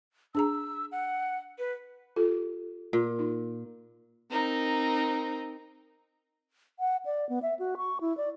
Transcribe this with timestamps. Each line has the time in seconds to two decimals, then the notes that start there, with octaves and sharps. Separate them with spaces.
0.35 D4 G#4 A#5 E6
0.92 F#5
1.59 B4
2.16 F4 G4 A4
2.93 A#2
3.19 D#4
4.29 C4 D#4 A#4
6.80 F#5
7.06 D5
7.29 B3
7.42 E5
7.59 F#4
7.77 C#6
8.01 E4
8.17 D5